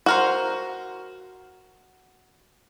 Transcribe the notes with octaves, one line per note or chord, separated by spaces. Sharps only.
F#4 A#4 C5